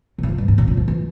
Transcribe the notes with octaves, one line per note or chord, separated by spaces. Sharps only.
C3
A#2
C3
G2
G#2
A#2
C#3
F3
E3